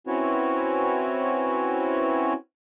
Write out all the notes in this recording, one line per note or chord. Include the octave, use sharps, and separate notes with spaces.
C4 C#4 E4 F#4 B4 C#5